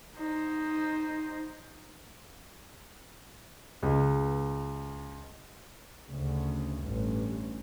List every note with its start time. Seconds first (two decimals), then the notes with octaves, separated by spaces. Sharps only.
0.16 D#4 C5
3.83 C#2
6.07 D2 C#3
6.84 A1 G2